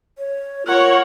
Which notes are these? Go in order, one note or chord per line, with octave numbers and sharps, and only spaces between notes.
C#5
F4 A#4 C#5 F#5